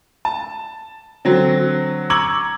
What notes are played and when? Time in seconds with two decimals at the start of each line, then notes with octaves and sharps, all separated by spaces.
0.25 A5
1.25 D3 F#3 C4
2.10 A#5 C#6 D6 E6 G#6 F#7